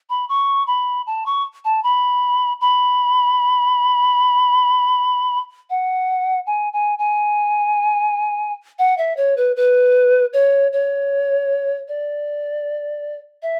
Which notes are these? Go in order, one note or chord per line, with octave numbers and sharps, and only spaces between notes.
B5
C#6
B5
A5
C#6
A5
B5
B5
F#5
G#5
G#5
G#5
F#5
E5
C#5
B4
B4
C#5
C#5
D5
E5